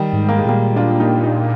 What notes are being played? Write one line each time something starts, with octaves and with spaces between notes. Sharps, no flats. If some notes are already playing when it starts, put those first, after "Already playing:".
Already playing: D#3 G3
G#2
A#3
G#3
A#2 G3 A#3
D4 F4
D#4 G4
D#4 G4